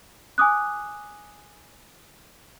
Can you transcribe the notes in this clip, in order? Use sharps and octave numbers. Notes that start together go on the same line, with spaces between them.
G#5 D6 D#6 F#6